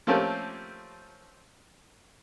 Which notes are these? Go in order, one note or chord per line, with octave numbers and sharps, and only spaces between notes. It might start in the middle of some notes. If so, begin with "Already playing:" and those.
F3 A3 A#3 C4 C#4 G4